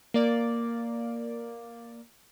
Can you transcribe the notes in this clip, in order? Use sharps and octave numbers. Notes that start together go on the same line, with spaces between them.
A#3 D5